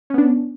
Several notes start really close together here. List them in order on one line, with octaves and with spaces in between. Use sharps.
C#4 B3 D4